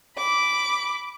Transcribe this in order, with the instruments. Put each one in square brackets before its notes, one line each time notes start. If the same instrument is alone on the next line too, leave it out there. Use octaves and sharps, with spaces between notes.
[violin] B5 D6